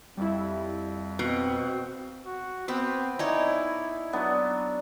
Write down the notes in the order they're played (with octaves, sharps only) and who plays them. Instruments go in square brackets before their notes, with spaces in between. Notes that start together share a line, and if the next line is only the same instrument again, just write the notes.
[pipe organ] F2 [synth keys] G3 E4
[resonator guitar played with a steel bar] B2 [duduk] C4
[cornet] F#4
[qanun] B3 B4 [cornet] C4
[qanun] D#4 C#5 D5 [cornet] E4 [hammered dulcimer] G#5
[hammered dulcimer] F#3 B3 D4